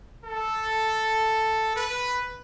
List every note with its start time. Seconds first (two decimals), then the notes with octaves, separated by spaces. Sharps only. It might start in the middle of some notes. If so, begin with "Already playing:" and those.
0.24 A4
1.76 B4